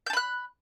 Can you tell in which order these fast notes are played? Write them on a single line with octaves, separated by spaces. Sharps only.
G6 A5 B5 F#6